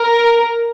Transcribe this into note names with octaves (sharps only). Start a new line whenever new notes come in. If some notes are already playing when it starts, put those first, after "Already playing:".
Already playing: A#4